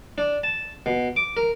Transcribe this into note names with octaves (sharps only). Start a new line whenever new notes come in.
D4
A5
B2
D6
A#4